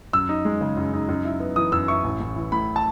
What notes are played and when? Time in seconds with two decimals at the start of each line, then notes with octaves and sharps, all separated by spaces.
0.13 F#2 E6
0.29 D#4
0.45 G#3
0.61 C#3
0.77 F#2
0.93 D#4
1.09 F#2
1.25 E4
1.40 B3
1.56 E3 D#6
1.72 F#2 E6
1.88 E4 C#6
2.04 A1
2.21 A1
2.36 E3
2.52 A2 B5
2.76 A5